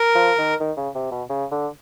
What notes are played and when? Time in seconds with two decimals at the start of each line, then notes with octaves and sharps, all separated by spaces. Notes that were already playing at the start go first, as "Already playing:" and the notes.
Already playing: A#4
0.15 F3
0.39 D#3
0.60 D#3
0.77 C#3
0.95 C3
1.11 B2
1.30 C#3
1.52 D3